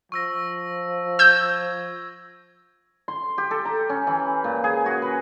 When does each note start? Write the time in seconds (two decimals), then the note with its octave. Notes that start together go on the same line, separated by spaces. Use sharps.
0.12 F3 C#6 E6 A#6
1.19 E6 G6 G#6
3.08 C6
3.38 G4
3.51 A4
3.65 A#5
3.89 C#4
4.07 E3
4.44 A#2
4.64 G#4
4.86 F#4
5.02 B4